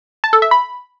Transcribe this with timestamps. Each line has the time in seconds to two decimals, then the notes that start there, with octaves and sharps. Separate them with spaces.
0.24 A5
0.33 A4
0.42 E5
0.51 B5